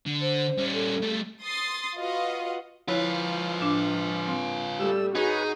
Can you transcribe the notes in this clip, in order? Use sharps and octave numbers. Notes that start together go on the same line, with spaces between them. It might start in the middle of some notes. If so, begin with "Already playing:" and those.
D3
C5
G3 C#4
A4
G3 A3
C6 D#6 A6 C7
F4 F#4 B4 D#5 F5 F#5
F3 E4 F4 B4 C#5
A2 D4 D6
C4
G3 A3 E6
D#4 F#4 G#4 B4 C#5 G#5